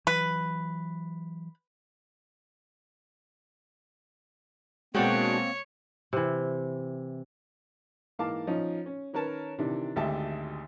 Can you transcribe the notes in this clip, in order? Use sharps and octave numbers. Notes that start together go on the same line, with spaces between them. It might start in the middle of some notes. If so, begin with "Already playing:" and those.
E3 F#3 B4
B2 G#3 A#3 C4 D4 F#4 C#5 G5
C3 E3
G#2 E3 A#3 F5 A5 D6
F3 C#4 D#4
C#4
D#3 C#4 A#4 B4 C#5 A5
C3 D#3 E3 D4
G#1 D2 G4 E5 A5